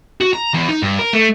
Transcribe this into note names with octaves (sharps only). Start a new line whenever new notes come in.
F#4
A#5
E2
D#4
G2
A#4
A3